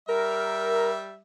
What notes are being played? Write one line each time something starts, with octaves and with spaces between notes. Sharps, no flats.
G3 A#4 E5